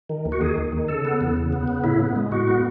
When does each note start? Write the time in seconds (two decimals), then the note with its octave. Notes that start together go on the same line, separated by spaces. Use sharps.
0.09 D#3
0.25 D#2
0.32 F#4
0.41 D#3 G#4
0.57 D#2
0.72 D#3
0.88 C#3 A4
1.05 B3
1.21 E2
1.37 C#3
1.53 B3
1.68 C#3
1.84 A2 E4
2.00 B3
2.16 G#3
2.32 A2 F#4
2.48 B3